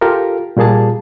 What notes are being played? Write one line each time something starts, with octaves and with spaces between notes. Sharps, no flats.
F4 G4 A4 A#4
A#2 G3 A#3 G#4 A5